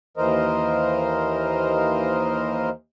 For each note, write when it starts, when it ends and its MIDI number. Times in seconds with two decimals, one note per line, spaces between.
0.17 2.70 39
0.17 2.70 52
0.17 2.70 70
0.17 2.70 72
0.17 2.70 75